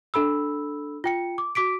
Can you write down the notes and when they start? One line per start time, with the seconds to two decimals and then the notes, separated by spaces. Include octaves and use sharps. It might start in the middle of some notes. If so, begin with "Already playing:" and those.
0.14 D4 A4 B5 E6
1.04 F4 G5 C#7
1.38 D6
1.55 F#4 D6 B6 D7